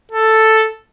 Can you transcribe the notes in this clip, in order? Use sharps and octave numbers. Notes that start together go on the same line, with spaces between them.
A4